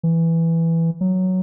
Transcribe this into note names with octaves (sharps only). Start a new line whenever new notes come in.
E3
F#3